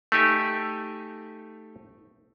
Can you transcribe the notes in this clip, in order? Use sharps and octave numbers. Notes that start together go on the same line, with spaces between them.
A3 D#4 G4 G#5